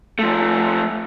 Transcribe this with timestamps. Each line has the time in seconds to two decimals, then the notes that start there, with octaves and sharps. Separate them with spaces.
0.19 F3 A3